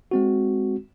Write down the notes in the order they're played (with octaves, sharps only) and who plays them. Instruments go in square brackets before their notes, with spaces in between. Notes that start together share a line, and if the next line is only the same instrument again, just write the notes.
[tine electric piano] G#3 C4 F#4